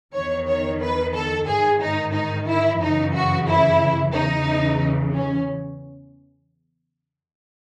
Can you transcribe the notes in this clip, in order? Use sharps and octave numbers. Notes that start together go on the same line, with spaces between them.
E2 D#3 C#5
C#5
B4
A4
G#2 D#3 G#4
D#4
D#4
E4
F#2 C#3 E3 D#4
F#4
E4
E2 C#3 E3 D#4
C#4